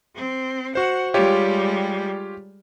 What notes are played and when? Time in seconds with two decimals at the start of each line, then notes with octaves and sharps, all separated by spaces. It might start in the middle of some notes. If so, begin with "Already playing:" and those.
0.15 C4
0.75 F#4 C5 F#5
1.14 G3 G#3 F4 G4 C#5